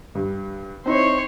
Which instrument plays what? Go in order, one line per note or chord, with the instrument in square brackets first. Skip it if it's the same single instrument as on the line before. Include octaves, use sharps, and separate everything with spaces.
[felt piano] G2
[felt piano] C4 D#4 E4 [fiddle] C5 C#5